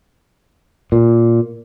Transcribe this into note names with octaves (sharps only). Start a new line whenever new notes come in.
A#2